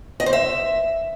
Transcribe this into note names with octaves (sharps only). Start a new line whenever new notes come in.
D#5
C5
E5